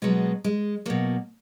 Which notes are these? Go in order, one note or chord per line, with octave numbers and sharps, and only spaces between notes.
B2 F#3 G#3 B3
G#3
B2 F#3 A#3